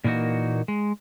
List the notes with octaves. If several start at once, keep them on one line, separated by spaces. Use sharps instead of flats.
A#2 E3 A#3 D#4 F#4
G#3